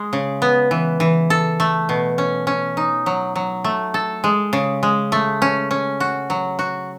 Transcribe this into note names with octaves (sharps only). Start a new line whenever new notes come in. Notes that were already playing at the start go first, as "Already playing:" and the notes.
Already playing: G#3
C#3
B3
E3
E3
A4
A3
B2
C#4
C#4
D#4
F#3
F#3
A3
A4
G#3
C#3
G#3
A3
C#4
C#4
F#4
F#3
F#4